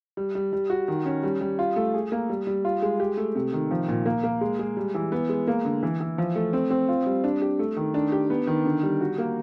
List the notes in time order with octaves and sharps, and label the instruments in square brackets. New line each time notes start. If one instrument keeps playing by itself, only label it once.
[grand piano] G3
G3
G3
F#4
D#3
C#4
G3
G3
F4
A3
G#4
A#3
G3
G3
F4
G#3
G4
A3
C3
D#3
F3
A#2
A#3
A#3
G#3
G#3
G3
E3
B3
G#3
A#3
D3
E3
E3
F3
A3
C4
C4
F4
G3
D4
G4
A3
D#3
D4
G4
B3
D#3
D3
G3
F#4
A#3